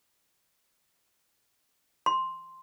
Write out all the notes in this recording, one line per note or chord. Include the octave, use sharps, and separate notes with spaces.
C6